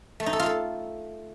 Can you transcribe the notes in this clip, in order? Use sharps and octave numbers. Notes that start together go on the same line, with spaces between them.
A3
D#4
A4
F4
A4